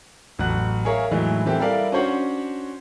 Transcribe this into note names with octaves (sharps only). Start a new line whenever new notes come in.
A1 F#3 F#5 F#6
G#4 A#4 C#5 E5 F5
A2 E3 F#3 G#3 D#4
E3 A#3 C4 G4 A4 E5
G3 E4 A4 A#4 D5 F5
C#4 D4 F#4 C5 C#5 F#5